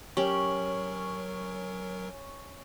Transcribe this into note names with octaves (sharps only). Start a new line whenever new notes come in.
F#3 C#4 G4 A#4 C#6 F#7